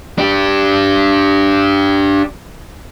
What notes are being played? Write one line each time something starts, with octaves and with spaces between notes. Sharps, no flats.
D4 G4